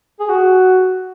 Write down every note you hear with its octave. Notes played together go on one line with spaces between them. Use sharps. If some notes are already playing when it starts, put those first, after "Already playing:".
G#4
F#4